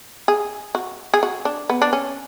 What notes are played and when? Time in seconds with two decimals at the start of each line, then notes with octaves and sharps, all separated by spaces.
0.28 G#4
0.75 F#4
1.14 G#4
1.23 F#4
1.45 D4
1.70 B3
1.82 D4
1.93 C#4